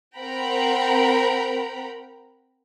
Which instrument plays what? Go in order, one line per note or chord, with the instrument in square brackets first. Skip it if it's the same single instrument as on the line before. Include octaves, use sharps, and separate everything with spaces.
[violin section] C4 A#4 F#5 G5 A#5 B5